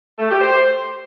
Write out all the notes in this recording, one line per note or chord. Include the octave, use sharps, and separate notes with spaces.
A3
G4
C5